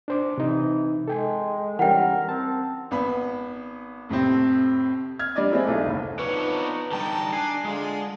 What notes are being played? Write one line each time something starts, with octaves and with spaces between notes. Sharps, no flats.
D4 C5 D6
C3 E3 D#4
G#3 A4 G5 G#5
E3 G3 C#4 A#4 F#5 G5
C4 A5
G#1 B3 B5
F2 A2 C3 C4
F6 G#6
G3 D4 D5 D#5
G#3 C4 E4
B1 A3
F#1 D#2
F3 B3 D4 D#4 B4 C#5
D3 G3 D#4 G5 A5 A#5
D4 G#5 C7
D3 G#3 D4 F4 G#4